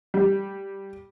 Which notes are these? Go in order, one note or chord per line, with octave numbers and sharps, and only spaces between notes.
G3